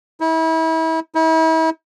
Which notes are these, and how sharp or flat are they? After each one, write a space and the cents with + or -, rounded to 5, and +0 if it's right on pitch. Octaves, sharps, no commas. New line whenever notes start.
E4 -35
E4 -40